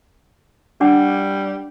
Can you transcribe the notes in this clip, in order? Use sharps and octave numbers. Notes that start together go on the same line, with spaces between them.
G3 D4 F#5 D6